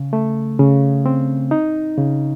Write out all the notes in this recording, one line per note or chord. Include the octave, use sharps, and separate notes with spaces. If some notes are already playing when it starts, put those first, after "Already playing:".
Already playing: C#3
A3
C#3
C4
D#4
C#3